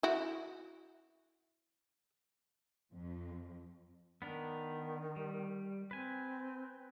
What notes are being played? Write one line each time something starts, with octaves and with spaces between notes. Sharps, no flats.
E4 F#4
F2
D#3 B3 D4 A#4
G3
C4 B4 G#5